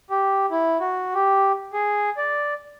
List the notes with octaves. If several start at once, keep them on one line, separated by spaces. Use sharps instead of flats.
G4
E4
F#4
G4
G#4
D5